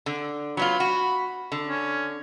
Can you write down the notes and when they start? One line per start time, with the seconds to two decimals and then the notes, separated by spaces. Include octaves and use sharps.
0.06 D3
0.57 F#3 B3 F4 B5
0.80 F#4
1.52 D3
1.69 C#4